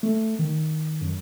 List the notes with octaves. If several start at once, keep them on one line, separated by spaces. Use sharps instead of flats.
A3
D#3
F#2